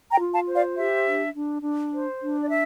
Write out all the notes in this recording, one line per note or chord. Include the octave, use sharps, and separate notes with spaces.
G5 A#5
F4
F5 A5
C5
D5 F5
G4 E5
D4
D4
D4
C5
D4
D5
E5